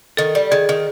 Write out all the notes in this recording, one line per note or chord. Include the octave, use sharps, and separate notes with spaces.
D#3 A4
G3
D#3 G#4
D#3